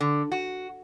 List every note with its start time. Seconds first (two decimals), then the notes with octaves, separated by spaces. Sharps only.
0.01 D3
0.32 F#4